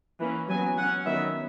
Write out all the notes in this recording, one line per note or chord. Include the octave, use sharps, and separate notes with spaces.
E3 A#3 C#4
F#3 B3 G#5
F#3 C#4 F#5
D#3 F#3 B3 E5